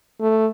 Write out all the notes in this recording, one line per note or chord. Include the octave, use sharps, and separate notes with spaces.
A3